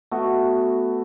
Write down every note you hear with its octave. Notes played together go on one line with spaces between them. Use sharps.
A3 B3 F#4